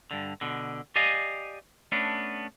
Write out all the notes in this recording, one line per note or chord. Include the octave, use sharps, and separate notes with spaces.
G2 D3
B2 D3
G4 D5 D#5 F5 G#5
A3 B3 C#4 D4